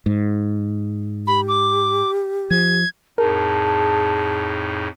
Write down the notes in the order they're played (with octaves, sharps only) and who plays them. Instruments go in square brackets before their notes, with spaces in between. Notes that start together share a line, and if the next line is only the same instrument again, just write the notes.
[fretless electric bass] G#2
[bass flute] G4 [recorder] B5
[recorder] D6
[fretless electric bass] F3 [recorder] G#6
[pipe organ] F2 A2 D#4 [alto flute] G#4 [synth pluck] A#4 [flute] A5